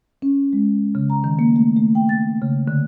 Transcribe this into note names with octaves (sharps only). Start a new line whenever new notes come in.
C#4
G#3
C#3
A#5
D#3
A#3
A3
A3
G5
A6
C#3
D3